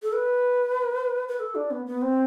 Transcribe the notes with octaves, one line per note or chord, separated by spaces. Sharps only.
A4
B4
B4
A4
D4
B3
B3
C4